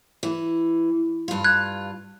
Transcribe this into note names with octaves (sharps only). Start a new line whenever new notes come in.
E3
G2 F4
F#6 G#6